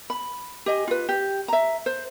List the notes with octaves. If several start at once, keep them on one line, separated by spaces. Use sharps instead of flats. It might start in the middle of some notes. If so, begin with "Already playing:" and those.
B5
G4 D#5 G#5
F4 B4
G4
E5 A#5
C5